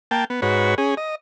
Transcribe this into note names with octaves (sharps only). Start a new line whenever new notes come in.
A#3 G5 A5
B3
G#2 F#4 B4 C#5
C#4 G#4
D#5